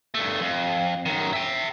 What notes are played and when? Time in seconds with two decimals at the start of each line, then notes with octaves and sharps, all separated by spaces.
0.14 G2 A3
0.41 F2
1.06 F#2 D#3
1.33 E5 G5